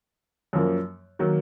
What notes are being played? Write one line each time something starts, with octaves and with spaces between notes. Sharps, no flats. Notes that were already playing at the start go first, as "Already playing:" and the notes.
F#2 F3 A#3
D#3 F#3 A#3